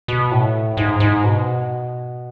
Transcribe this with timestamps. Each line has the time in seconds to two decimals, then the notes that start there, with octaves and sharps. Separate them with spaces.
0.08 B2
0.31 A2
0.77 G#2
1.00 G#2
1.24 B2